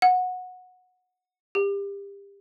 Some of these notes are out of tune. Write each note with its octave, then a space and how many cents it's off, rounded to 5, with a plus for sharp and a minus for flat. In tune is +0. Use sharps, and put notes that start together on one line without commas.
F#5 -15
G4 +30